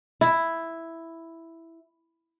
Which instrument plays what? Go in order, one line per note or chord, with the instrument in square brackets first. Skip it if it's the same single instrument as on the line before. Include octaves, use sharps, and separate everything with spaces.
[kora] E4